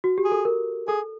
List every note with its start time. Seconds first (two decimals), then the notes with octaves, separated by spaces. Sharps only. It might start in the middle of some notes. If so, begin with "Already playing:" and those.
0.04 F#4
0.18 G4
0.25 G#4
0.32 A4
0.45 A#4
0.88 G#4 A4